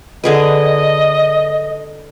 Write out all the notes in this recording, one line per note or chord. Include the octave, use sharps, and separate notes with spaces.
D3 G#4 B4 D#5